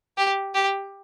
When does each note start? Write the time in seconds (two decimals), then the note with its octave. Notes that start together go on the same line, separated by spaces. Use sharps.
0.17 G4
0.54 G4